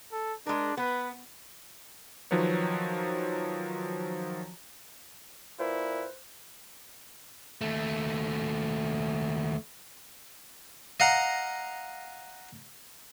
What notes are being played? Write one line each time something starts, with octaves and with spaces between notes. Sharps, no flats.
A4
G#3 D4 A#4
B3 B4
D#3 F3 F#3 B4 C#5
A#2 E4 B4 C5
D#2 A3
D#5 F5 F#5 A#5